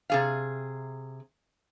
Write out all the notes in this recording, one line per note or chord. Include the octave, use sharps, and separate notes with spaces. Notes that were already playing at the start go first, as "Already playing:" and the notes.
C3 G#4 F5